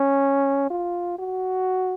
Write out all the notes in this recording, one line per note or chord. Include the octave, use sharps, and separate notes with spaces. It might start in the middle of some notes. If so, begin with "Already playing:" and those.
Already playing: C#4
F4
F#4